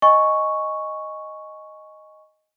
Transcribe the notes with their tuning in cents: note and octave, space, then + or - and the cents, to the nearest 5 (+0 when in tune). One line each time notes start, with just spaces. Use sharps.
D#5 +0 G#5 +0 C#6 +0